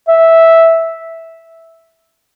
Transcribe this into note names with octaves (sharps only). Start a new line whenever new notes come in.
E5